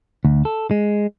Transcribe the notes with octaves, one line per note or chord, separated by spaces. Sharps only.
D2
A4
G#3